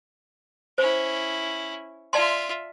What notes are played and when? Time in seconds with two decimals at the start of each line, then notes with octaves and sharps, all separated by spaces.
0.78 C#4 E4 C5
2.13 F4 D5 E5 A5 C6